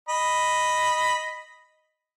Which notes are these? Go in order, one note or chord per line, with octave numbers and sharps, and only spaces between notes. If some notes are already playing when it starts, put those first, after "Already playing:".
D#5 B5